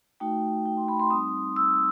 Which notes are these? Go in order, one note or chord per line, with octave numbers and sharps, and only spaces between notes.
A3 D#4 F#4 G5
G5
C6
B5
C6
G3 C4 D#4 D#6
E6